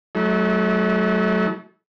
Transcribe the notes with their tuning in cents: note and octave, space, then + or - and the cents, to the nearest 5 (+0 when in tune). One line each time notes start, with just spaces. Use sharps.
F#3 +10 A3 -30 E4 -40